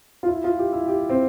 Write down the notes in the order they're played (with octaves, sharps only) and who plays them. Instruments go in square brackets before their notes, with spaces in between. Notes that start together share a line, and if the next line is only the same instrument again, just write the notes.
[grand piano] F4
E4
F4
G4
E4
G4
C4